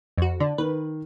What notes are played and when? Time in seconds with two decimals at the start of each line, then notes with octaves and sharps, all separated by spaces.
0.18 F2 F#4
0.40 D3 D5
0.58 D#3 B4